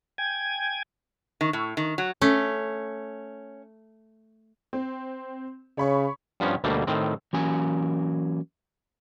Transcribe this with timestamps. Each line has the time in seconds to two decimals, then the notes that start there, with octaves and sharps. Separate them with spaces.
0.18 G5 G#5 G#6
1.41 D#3
1.53 A2
1.77 D#3
1.98 F#3
2.22 A3 C#4
4.73 C4
5.78 C#3 C#5 B5 C#6
6.40 G2 F3 B3 C#4
6.64 D2 B2 G3 A3 A#3
6.87 A2 D#3 C4
7.33 E3 F#3 A#3 C#4 G#5